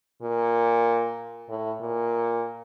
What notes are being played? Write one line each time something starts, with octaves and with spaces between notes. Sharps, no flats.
A#2
A2
A#2